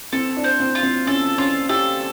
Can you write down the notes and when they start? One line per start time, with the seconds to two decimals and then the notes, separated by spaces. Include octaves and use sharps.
0.13 C4 A4
0.37 D4
0.44 C5
0.60 C4
0.75 F4
0.83 C4
1.07 C#4 A4
1.38 C#4 F4
1.69 G4 A4